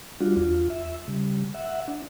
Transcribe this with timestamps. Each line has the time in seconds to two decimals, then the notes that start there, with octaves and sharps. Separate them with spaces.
0.20 G3 D4 F4 F#4
0.37 E2 F4
0.70 E5
1.08 C#3 G3
1.54 E5 F#5
1.88 D4